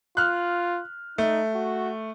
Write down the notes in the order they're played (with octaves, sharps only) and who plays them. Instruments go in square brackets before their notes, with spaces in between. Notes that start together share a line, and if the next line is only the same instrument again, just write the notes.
[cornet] F4 [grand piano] F6 F#6
[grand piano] A3 [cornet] D#4
[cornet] F#4